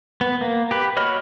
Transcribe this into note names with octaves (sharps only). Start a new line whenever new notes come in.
B3
A#3
G4 B4
F#4 C#5 D#5 B5 F6